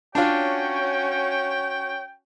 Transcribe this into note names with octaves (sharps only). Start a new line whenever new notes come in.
C#4 D4 F4 F#4 C#5 G5